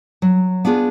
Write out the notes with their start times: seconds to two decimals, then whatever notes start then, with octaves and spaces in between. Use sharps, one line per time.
0.22 F#3
0.65 B3 D4 F4 G#4